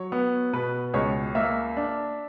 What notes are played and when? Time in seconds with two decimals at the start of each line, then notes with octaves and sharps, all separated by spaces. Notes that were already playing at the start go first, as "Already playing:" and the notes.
Already playing: F#3 C#5
0.12 B3
0.53 B2 B4
0.94 C#2 C#5
1.35 A#3 E5
1.77 D4